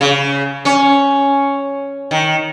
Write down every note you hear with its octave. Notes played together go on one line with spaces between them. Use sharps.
C#3
C#4
D#3